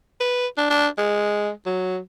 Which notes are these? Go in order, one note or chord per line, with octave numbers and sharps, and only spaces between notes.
B4
D4
D4
G#3
F#3